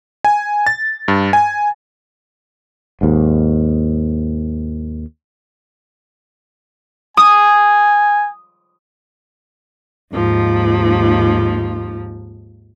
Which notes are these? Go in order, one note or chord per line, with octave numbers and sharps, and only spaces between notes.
G#5
A6
G2
G#5
D#2 G#2
G#5 D#6
D#2 G#2 F3